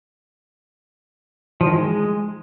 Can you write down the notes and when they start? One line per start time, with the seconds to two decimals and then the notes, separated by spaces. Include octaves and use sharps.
1.61 F3
1.66 D#3
1.72 G#3